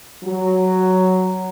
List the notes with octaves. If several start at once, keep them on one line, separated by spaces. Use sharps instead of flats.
F#3